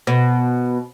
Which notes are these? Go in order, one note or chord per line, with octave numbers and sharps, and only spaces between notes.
B2